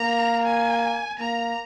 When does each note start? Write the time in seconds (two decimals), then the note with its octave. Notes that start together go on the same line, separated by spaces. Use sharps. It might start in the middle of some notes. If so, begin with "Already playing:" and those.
Already playing: A#3 A#5
0.44 G#5
1.19 A#3 A#5